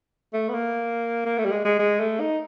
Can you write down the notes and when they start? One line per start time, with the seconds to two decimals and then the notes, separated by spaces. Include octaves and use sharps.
0.33 A3
0.49 B3
0.54 A#3
1.26 A#3
1.38 A3
1.46 G3
1.52 G#3
1.65 G#3
1.79 G#3
2.00 A3
2.20 D#4